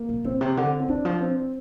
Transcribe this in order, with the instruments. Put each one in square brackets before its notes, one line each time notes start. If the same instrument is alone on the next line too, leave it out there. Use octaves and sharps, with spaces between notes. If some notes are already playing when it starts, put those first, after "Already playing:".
Already playing: [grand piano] A#3
[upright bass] A#2
[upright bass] A#2 [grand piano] C4
[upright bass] C3
D3
[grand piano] C4
[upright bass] D#3 [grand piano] D4
[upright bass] F3
[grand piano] C4